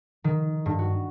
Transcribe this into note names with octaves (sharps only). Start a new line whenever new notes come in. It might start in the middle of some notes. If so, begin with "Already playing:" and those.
D#3
G2
F#4